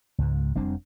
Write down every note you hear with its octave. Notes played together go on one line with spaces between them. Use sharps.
C#2 G#2
F1 G3 C4 D4